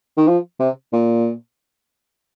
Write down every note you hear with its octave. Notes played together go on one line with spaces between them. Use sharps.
D#3
F3
C3
A#2